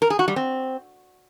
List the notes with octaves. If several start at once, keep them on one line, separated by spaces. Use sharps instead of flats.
A#4
G#4
F#4
G3
C4